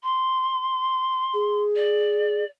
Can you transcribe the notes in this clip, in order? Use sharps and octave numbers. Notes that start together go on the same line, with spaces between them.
C6
G#4
D5